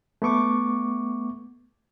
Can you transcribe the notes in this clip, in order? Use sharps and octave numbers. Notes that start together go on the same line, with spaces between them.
A3 B3 C#6 D6